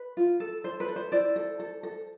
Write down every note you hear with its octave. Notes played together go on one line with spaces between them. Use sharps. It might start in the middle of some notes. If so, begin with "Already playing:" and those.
Already playing: B4
F4
A4
A4 C5
B4
A4
C5
E4 C5 D5
A4
A4
A4